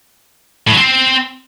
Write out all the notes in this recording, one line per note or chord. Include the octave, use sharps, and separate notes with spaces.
A2
F#3
C4